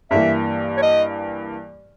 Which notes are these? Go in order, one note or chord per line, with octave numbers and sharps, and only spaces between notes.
G2 E3 A#3 E5
C#5
D#5